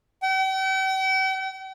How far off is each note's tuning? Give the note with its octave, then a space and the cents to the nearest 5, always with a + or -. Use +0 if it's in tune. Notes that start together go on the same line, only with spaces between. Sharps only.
G5 -45